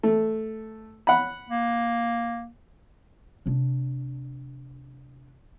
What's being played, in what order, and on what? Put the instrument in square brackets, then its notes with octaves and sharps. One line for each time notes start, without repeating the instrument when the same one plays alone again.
[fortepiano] A3
F#5 B5
[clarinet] A#3
[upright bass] C3 D4